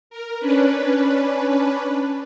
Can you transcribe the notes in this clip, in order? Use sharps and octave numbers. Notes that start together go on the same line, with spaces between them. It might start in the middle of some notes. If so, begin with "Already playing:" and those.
A#4
C#4 D4 B4